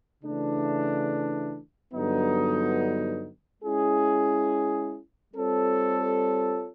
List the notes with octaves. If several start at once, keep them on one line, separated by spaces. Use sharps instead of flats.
C#3 E3 A3 D4
G2 D3 F#3 B3 D#4
G#3 C#4 E4 G#4
G3 C4 F4 A4 C#5